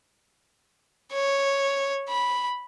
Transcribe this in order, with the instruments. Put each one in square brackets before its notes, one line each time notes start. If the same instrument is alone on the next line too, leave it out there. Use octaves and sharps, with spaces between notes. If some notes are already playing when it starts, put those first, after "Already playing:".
[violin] C#5
B5